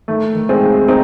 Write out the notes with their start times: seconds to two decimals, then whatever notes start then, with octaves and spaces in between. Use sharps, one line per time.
0.08 D#3 A3
0.35 D#3
0.49 G#3 C4
0.62 D#2
0.88 C4 D#4